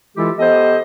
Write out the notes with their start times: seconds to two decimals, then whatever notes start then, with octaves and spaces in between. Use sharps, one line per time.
0.17 E3 G#3 E4 F4 G4 A4
0.39 B3 G4 A4 C5 D#5